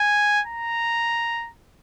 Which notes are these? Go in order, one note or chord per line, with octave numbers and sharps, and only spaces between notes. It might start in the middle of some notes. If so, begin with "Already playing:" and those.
Already playing: G#5
A#5